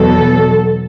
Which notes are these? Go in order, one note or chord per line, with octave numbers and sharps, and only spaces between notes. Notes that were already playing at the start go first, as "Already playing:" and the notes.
Already playing: E2 B2 F#3 A4